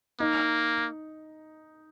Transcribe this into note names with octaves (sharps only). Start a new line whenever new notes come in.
A#3 D#4